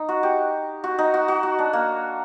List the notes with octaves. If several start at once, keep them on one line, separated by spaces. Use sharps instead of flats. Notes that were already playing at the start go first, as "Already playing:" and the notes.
Already playing: D#4
F#4
G4
F#4
D#4
F#4
F#4
F#4
D4
A#3